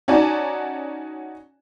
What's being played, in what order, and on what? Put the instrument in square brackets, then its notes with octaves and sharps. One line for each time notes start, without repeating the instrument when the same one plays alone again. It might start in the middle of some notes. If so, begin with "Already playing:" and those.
[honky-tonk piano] C#4 D#4 F#4 D5 G#5 A5